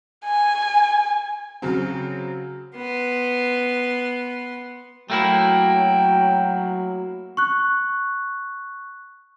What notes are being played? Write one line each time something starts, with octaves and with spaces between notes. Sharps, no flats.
G#5
C#3 F#3 C4
B3 C6
F#3 A3 A#3 E4 G5
C#6 F#6